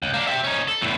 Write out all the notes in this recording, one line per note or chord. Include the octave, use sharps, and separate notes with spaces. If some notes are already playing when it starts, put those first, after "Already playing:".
C#2
A#3 D4
G4 E5
C#4 D#4
A4
E2 A2